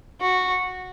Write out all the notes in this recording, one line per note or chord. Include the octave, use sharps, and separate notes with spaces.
F#4